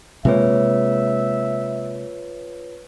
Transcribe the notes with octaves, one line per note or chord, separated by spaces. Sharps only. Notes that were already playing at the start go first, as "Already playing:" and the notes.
C3 G#3 A#3 F4 B4 C#5 E5